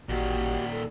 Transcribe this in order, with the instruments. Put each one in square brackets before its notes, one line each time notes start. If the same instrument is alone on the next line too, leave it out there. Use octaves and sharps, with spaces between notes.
[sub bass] A1 [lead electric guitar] A#2 D#3 [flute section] F#4 G4 F#5
[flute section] A4